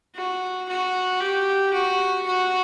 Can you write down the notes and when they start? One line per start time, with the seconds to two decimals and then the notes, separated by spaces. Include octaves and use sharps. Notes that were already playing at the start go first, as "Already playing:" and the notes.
0.15 F#4
0.68 F#4
1.21 G4
1.73 F#4
2.26 F#4